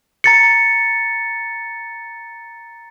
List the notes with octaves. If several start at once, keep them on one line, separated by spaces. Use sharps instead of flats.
A#5 A6 C#7